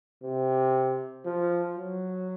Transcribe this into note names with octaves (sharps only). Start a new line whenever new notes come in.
C3
F3
F#3